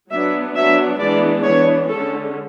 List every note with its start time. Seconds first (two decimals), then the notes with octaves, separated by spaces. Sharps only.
0.11 F#3 B3 D4 E5
0.56 F#3 B3 D4 E5
1.00 E3 G#3 B3 D4 D5
1.45 E3 B3 D4 C#5
1.90 D3 G#3 C#4 A4